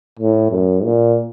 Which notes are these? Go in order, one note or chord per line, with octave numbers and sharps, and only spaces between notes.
A2
F#2
A#2